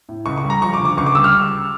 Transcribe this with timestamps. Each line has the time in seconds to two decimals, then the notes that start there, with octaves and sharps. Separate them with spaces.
0.09 A2
0.26 C#2 C#6
0.38 C#6
0.44 G3
0.50 A#5
0.61 F3 C#6
0.74 D6
0.80 D2
0.85 D6
0.97 C#2 C#6
1.06 D6
1.15 G3 E6
1.24 F6